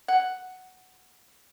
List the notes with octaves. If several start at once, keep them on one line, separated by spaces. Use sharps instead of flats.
F#5